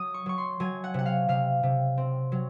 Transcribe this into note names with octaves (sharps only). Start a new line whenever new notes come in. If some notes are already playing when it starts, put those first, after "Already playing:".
Already playing: F#3 D#6
C#6
F#3 C#6
C6
F#3 G#5
F#5
C3 F#5
F5
C3 F5
C3
C4
F#3